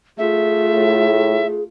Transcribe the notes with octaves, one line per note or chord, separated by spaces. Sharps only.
A3 F4 G#4 E5
A2